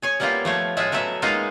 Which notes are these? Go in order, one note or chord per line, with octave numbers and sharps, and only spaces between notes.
G#4 C#5 G#5
G3 A#3 B3 E4 F4 G4
F3 A3 C#5
A2 G#3 F4 G#4 E5 F#5
F#3 A3 B3 E5
G#3 A#3 B3 D#4 F4 F5